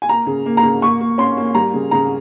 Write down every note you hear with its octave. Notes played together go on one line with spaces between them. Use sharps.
G#5
A#3 A#5
C#3
A#3
A#5
C#3
A#3 C#6
A#3
C#4 C6
A#3
G3 A#5
C#3
C#3 A#5